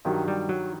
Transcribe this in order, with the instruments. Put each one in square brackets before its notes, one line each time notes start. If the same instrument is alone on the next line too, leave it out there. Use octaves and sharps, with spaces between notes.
[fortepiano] G2 D#3 F#3
[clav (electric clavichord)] G3
F#3